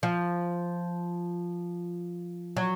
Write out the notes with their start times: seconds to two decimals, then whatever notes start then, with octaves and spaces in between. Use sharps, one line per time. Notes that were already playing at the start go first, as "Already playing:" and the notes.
0.03 F3
2.57 F#3